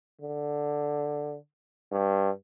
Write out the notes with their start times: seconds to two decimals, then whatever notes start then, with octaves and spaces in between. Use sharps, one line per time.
0.21 D3
1.92 G2